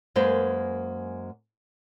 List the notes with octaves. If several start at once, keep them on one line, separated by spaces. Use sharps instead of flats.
F#2 G#3 A#3 B4 C5